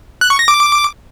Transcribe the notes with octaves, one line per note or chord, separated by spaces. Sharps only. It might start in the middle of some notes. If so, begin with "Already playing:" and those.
F#6
C#6
A#6
D6